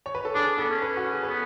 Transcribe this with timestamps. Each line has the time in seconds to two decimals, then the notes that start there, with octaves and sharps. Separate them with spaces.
0.06 C#5
0.15 B4
0.25 A4
0.35 D4 G#4
0.58 B3 A4
0.70 C#4
0.82 B4
0.97 F#4
1.13 G#4
1.23 B4
1.28 B3 A4